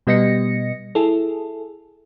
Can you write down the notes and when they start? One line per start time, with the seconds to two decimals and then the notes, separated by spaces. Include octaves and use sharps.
0.07 B2 G3 B3 D#5 A#6 C#7
0.95 E4 G#4 A4